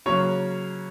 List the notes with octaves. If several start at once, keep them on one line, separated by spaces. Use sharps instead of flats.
C#3 F#3 A#3 C#5